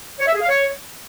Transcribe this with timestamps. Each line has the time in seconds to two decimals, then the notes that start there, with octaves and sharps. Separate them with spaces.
0.20 C#5
0.27 E5
0.34 G#4
0.41 F5
0.49 C#5